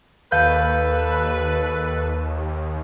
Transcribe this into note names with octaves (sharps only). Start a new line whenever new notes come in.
D#2 A4 B4 F5 G6